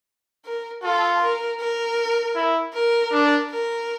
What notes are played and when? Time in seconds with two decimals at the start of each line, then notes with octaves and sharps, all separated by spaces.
0.45 A#4
0.83 F4 A4
1.21 A#4
1.60 A#4
2.36 E4
2.74 A#4
3.13 D4
3.51 A#4